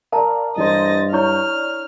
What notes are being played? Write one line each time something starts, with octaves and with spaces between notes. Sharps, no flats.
A#4 D5 F5 A5 A#5
G2 E3 C5 D#5 A6 A#6
D4 E4 C#5 A#5 C#6 F6 G6